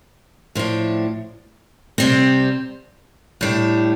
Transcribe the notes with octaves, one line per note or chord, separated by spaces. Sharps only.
A2 F3 D4
C3 G3 C4
A2 G3 D4